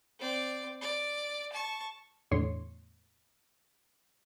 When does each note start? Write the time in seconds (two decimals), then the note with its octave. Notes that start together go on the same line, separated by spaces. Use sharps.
0.19 C4 D5
0.82 D5
1.53 A5 C#6
2.31 E2 A2 D3 C#5 C6